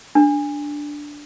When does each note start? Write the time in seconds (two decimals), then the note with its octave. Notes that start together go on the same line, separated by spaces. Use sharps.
0.15 D4